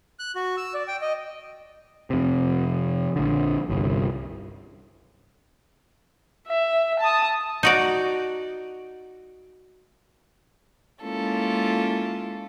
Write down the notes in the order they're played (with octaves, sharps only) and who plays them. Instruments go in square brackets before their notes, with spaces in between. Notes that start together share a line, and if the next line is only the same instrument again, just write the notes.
[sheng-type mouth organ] F#6
F#4
E6
D5
G5
D#5
[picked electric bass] F2 C3
A#1 D3
G1 C2
[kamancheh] E5
A5 D#6
[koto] D#4 F#4 D5
[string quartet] G#3 A#3 C#4 E4 F4 A4